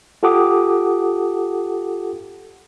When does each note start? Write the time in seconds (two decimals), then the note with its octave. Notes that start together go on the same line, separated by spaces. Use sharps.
0.23 F4 G4 A4 F#5 D6 D#6